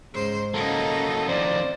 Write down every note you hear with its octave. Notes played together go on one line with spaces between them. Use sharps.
G#2 C#3 C5
C#3 F#3 A#3 D#4 A4
F2 D#3 C5 D5